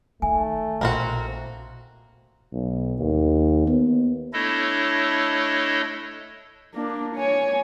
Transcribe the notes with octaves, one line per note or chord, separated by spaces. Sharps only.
D#3 A3 G#5
A#1 A#3 C4 F#4
B1
D#2
B3
A3 D4 E4 A4 C#5 D#5
A#3 D4
C#5 G#5